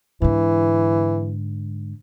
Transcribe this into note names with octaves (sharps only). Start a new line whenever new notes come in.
G#2 D3 E3